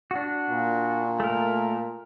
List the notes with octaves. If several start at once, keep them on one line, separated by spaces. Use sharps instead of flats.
D4 F#4
A#2
A3 A#4